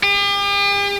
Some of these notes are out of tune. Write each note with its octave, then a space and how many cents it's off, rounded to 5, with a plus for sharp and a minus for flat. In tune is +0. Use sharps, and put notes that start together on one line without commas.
G4 +45